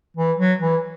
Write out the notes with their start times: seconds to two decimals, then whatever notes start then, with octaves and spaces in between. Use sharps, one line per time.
0.17 E3
0.38 F#3
0.61 E3